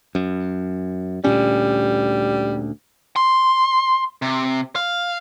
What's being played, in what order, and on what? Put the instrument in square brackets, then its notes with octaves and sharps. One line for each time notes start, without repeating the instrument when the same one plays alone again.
[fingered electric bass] F#2
[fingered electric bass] D2 A#2 C#4 [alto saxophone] G3
[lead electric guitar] C6
C3
F5